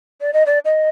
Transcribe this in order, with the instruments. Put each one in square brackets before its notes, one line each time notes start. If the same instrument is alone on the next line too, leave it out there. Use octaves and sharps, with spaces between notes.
[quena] D5
D#5
D5
D#5